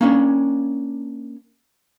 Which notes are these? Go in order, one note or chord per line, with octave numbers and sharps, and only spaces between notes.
A#3 C#4 D4